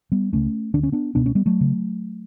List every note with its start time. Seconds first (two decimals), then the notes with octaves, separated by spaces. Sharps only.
0.12 G3 B3
0.32 C#2 C#3 A3 C#4
0.74 D2 D3 D4
0.83 C#4
0.92 B3 D4
1.15 C#2 B2 B3 D4
1.25 A3 C#4
1.35 G3 B3
1.46 F#3 A3
1.61 C#3